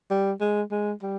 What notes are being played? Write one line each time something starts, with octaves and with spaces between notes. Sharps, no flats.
G3
G#3
G#3
G3